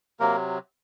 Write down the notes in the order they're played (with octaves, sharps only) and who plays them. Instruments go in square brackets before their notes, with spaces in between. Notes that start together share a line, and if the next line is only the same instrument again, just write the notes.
[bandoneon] C3 F#3 A#3 A#4